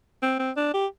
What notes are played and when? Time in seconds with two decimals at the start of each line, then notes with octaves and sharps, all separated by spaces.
0.22 C4
0.39 C4
0.57 D4
0.74 G4